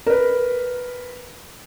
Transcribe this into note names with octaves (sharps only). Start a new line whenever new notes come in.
A#4 B4